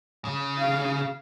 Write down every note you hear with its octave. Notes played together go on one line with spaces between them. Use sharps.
C#3
F5